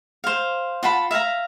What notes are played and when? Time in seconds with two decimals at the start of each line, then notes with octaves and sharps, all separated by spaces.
0.24 C5 F5
0.83 F4 F#5 A5 B5
1.11 E5 F5 G#5 A#5